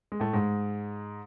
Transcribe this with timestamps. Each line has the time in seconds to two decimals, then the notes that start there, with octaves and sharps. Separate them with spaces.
0.12 G#3
0.20 A2 A3
0.33 G#2 G#3